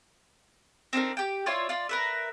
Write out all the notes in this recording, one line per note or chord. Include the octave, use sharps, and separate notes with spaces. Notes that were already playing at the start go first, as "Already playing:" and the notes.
C4 D4 D#4 A#4
G4 G5
E4 F4 C#5 D5
F4 D5
A#4 B4 E5